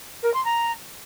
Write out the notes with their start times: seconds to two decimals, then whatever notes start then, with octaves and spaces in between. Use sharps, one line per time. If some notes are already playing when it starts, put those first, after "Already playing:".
0.22 A#4
0.33 C6
0.45 A#5